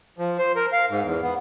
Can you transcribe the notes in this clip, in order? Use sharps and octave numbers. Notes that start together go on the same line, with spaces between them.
F3
C5
A#4
F5
G#2
E2
B3